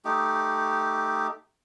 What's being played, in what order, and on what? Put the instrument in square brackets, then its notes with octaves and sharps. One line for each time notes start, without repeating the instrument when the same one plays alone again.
[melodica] A3 D#4 G4